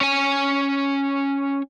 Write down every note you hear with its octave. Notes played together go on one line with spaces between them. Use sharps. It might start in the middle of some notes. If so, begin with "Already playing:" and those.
C#4 G#5